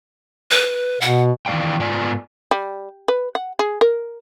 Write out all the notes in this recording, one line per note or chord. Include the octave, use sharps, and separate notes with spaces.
B4
B2 F#5
D#3 E3 G3 D5 F5 G5
G#2 B3 F4 D5 G#5
G3
B4
F#5
G#4
A#4